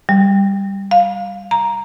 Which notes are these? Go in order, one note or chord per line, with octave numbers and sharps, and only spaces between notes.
G3
F5
A#5